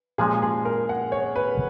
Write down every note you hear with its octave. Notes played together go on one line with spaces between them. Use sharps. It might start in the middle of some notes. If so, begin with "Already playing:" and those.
A#2 F3 G#3 C#4 G#4
G#4
A#4
F#5
C#5
B4